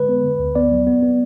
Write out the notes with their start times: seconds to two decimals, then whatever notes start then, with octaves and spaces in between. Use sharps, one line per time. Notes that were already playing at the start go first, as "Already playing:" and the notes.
Already playing: D3 G#3 B4
0.09 B3
0.23 D3
0.39 D2
0.55 B3 D5
0.72 F#3
0.87 B3
1.03 B3